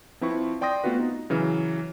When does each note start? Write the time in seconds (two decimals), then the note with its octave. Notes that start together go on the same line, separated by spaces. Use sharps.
0.21 F3 C4 E4 B4 C#6
0.61 D5 G5 C6 D#6 A#6
0.84 A3 B3 C4 F4 F#4 B4
1.00 D#4
1.30 C#3 E3 F#3 F6